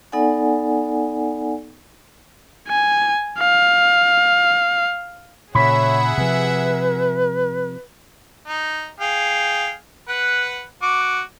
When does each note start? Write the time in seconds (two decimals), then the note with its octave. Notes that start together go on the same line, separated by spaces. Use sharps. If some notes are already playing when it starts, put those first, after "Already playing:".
0.12 B3 D#4 A4 D5 F#5 G#5
2.68 G#5
3.40 F5
5.55 A#2 C#3 G#4 C#5 E5 F#5 B5
6.18 C3 F3 B4
8.48 D#4
9.00 G#4 F5 G5
10.08 B4 F#5
10.82 F#4 D6